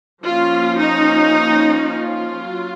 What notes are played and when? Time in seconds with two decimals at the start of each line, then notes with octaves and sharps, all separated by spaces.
0.24 F3 A#3 C#4 F4
0.79 D#4
1.89 F4
2.45 F#3